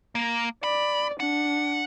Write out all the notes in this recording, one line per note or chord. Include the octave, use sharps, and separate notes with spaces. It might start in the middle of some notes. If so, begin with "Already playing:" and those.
A#3
D5 B5
D4 F#5